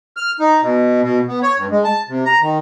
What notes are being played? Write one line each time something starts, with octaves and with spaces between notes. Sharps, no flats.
F6
D#4
B2
B2
B3
C#5
G2
G#3
A5
C3
A#5
D#3